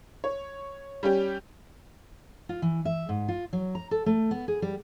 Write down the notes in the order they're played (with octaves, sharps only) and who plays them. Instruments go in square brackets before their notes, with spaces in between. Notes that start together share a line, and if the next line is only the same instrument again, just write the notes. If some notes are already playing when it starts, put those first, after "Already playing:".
[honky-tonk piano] C#5
G3 C#4 G4
[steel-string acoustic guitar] F4
E3
E5
G#2
F4
F#3
A#5
A4
A3
B3
G#4
G3